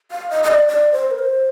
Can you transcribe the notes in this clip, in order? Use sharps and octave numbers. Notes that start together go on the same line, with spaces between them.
F5
D#5
D#5
D5
D5
C5
A#4
C5